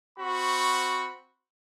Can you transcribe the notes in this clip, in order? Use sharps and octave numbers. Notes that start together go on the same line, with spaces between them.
C4 F#4 B5 C#6